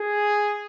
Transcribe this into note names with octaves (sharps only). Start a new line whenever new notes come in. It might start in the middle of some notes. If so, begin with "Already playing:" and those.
Already playing: G#4